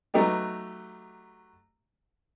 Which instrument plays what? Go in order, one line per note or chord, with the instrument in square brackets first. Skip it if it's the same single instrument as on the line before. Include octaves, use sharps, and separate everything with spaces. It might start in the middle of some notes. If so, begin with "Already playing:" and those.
[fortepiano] F#3 A3 B3 D#4 G4